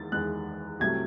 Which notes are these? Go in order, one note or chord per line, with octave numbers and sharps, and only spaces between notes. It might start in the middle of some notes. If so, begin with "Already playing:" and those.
Already playing: E2 D#3 G#3 A6
E2 D#3 G#3 F#6
C2 C3 F#3 A3 G#6